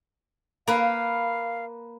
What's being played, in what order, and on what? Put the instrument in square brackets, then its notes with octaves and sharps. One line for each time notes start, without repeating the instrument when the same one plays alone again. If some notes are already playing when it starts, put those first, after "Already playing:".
[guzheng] A#3 B4 [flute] F5